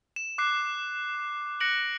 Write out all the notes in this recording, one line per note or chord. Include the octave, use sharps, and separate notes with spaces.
E7
D6 F#6 C7
F#6 A#6 C#7 D7 F#7